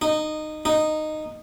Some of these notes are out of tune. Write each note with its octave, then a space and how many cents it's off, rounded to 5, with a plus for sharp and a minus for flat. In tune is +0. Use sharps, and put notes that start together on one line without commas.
D#4 -15
D#4 -10